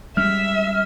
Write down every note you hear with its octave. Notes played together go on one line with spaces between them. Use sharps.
G3 G#3 C#4 E5 F6